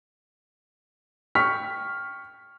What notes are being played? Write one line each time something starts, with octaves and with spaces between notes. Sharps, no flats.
G5 C#6 F6 B6